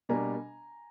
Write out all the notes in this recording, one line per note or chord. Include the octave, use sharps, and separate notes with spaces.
B2 G3 A#3 D4 G#5 A#5